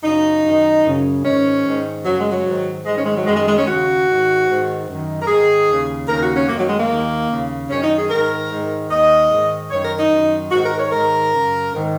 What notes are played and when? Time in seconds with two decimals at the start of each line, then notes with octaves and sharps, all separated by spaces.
0.03 F#2 C#3 D#4
0.45 F#2 D#3
0.84 F#2 C#3
1.24 G#2 D#3 C#4
1.65 G#2 D#3
2.05 F#2 C#3 F#3
2.18 G#3
2.30 F#3
2.45 G#2 D#3
2.86 G#2 D#3 G#3
2.96 C#4
3.06 G#3
3.16 F#3
3.26 F#2 D#3 G#3
3.36 G#3
3.47 G#3
3.56 C#4
3.66 D#2 C#3 F#4
4.07 G#2 D#3
4.47 G#2 D#3
4.87 F#2 D#3
5.22 A#4
5.27 G#2 D#3 G#4
5.68 D#2 C#3
6.08 D#2 C#3 A#4
6.22 F#4
6.35 C#4
6.48 F#2 A#3
6.52 D#3
6.59 F#3
6.69 G#3
6.78 A#3
6.88 D#2 D#3
7.29 D#2 C#3
7.70 F#2 D#3 C#4
7.83 D#4
7.96 G#4
8.10 G#2 D#3 A#4
8.49 G#2 D#3
8.90 D#2 D#3 D#5
9.30 G#2 D#3
9.70 F#2 D#3 C#5
9.84 A#4
9.98 D#4
10.11 F#2 D#3
10.51 G#2 D#3 F#4
10.65 A#4
10.78 C#5
10.92 G#2 D#3 A#4
11.32 F#2 C#3
11.72 G#2 D#3